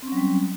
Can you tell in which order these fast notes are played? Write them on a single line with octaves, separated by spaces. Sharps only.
C4 C#4 F#3 G3